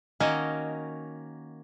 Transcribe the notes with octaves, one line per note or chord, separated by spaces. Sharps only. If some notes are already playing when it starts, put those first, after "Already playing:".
D#3 A#3 C#4 F#4 D#5